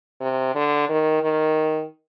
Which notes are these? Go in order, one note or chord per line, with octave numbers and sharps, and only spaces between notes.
C3
D3
D#3
D#3